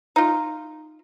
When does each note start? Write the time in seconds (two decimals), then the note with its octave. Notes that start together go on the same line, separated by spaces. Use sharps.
0.16 D#4 F4